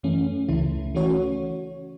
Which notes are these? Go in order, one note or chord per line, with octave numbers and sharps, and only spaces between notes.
F#2 E3 A3 C#4
C#2 C#3 E3 A3 E4
E3 A3 C#4 F#4 C#5